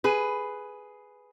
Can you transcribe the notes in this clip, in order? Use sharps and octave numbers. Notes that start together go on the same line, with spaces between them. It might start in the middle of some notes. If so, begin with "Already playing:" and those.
G#4 B4